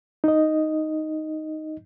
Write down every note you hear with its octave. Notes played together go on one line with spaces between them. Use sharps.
D#4 D#5